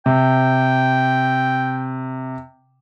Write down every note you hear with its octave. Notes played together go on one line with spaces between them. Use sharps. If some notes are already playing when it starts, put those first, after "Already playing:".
C3 G5